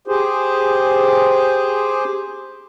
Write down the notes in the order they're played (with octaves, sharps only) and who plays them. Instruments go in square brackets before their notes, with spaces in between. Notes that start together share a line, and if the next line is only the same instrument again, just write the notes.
[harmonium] G4 G#4 C5